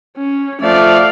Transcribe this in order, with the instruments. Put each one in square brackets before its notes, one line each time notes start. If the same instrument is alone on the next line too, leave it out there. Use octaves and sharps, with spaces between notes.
[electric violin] C#4
[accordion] F3 A3 [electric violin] D5 F5